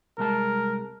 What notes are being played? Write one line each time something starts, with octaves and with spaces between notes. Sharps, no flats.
C2 G#3 A#4 A5